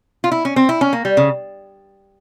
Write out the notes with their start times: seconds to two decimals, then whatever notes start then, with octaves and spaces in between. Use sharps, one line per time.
0.24 F4
0.32 E4
0.45 C#4
0.56 C4
0.69 E4
0.81 C#4
0.93 A#3
1.05 G3
1.17 C#3